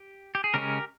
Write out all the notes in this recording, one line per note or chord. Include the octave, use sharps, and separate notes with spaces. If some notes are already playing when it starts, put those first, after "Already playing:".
Already playing: G4
G4
G#4
C#3 G#3 C#4 G4 A#4